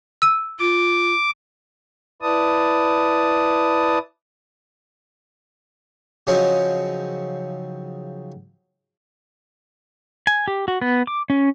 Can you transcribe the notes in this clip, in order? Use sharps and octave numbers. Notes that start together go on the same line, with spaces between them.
E6 D#7
F4 D6
E4 B4 D5 A5 D#6
C#3 F3 F#3 C4 C#4 D#4
G#5
G4
F#4
B3
D6
C#4